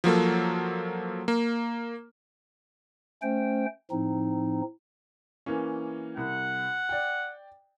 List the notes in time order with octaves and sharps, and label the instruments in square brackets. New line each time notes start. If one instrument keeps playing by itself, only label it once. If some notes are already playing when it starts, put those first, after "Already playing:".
[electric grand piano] F3 F#3 A#3 A4
A#3
[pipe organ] A3 C#4 C5 G5
A2 F3 C4 D#4
[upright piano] E3 A#3 C#4
[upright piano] C2 [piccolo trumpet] F#5
[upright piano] D5 G5